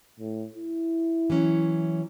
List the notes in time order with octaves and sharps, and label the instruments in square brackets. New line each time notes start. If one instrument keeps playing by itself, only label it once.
[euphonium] A2
E4
[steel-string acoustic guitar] E3 F#3 C#4